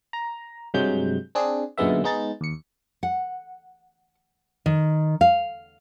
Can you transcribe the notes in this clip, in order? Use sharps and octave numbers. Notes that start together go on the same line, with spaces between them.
A#5
G2 C3 F#3 G#3 G6
C4 D4 G#4
F#2 A#2 D3 G#3 B3 E5
G#3 B3 D#4 G#4 A6
D#2 C#7
F#5
D#3
F5